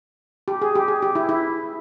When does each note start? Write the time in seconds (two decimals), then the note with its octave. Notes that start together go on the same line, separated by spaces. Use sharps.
0.48 G4
0.62 G#4
0.75 G4
0.88 G#4
1.02 G4
1.15 E4
1.29 E4